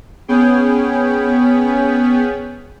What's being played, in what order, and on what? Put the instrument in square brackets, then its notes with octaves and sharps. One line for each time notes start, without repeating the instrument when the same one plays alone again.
[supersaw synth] B3 C#4 G#4 G5